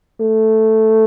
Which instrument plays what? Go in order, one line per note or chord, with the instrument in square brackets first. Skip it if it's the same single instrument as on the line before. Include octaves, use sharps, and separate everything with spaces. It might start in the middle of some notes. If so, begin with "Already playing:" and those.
[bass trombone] A3